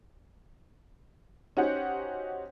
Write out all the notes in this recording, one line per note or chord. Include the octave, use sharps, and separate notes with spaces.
C#4 D#4 F#4 G4 C5 F#5